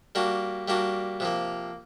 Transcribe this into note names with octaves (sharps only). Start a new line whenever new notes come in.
G3 A#3 D4 F#4
G3 A#3 D4 F#4
C3 F3 A#3